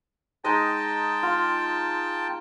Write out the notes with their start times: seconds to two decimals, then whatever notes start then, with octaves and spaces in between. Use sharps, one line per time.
0.44 G#3 D#4 D#5 G5 A5
1.23 F4